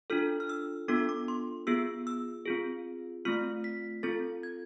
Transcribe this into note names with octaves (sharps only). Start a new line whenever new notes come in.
D4 F4 A4 F6
F6
E6
B3 D4 F4 A4 D6
D6
C6
B3 F4 G#4 E6
E6
C4 F4 G#4
A3 C4 F4 F6
B6
C4 F4 A4 A6
G#6